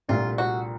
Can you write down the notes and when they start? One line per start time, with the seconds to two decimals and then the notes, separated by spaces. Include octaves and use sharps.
0.08 C2 A#2 F3 A3 D4 F4
0.38 F#4